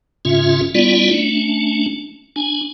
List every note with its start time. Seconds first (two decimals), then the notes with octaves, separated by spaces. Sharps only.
0.25 G#2 C#3 C#4 F4 E5
0.75 G3 B3 C#4 E4 F4 D5
1.12 A3 C#4 D4
2.36 D4 G#5